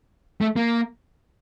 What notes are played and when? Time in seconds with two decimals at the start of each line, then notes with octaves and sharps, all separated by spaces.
0.41 A3
0.56 A#3